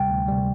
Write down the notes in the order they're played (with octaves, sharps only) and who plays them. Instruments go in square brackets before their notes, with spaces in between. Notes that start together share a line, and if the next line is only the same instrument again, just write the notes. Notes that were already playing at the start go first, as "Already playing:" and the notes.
Already playing: [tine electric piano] D2 C3 G3 [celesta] G5
[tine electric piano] D2
C3 G3